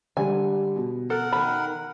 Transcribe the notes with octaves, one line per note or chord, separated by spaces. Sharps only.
D3 G3 G#5
B2
A4 A#4 F#5
D#3 B5